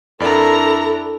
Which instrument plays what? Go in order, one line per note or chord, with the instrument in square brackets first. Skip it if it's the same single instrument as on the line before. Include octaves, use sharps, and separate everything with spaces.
[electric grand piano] F2 D5 [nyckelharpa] D4 E4 [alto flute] A4 [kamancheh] A#4 A#5